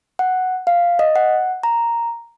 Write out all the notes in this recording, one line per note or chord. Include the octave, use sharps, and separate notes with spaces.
F#5
F5
D#5
F#5
A#5